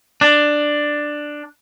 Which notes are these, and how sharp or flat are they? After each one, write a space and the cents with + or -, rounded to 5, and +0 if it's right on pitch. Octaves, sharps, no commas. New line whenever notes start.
D4 +10